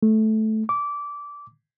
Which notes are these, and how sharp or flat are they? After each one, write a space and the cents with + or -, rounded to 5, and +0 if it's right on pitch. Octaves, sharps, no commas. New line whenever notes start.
A3 -10
D6 -20